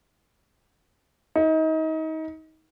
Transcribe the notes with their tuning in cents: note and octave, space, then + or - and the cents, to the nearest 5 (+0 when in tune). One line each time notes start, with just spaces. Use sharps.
D#4 +30